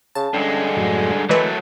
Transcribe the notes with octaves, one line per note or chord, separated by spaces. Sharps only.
C#3 A5
G2 D3 G#3 C#4
F#2 A2 F#3
E3 F#3 G#3 A3 A#4 B4